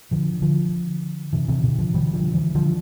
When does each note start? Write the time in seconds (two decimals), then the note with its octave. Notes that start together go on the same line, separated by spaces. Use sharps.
0.11 D3 F3
0.42 D3 F3
1.33 C3 E3
1.48 C3 E3
1.64 B2 D3
1.79 D3 F3
1.94 E3 G3
2.14 D3 F3
2.34 E3 G3
2.55 D3 F3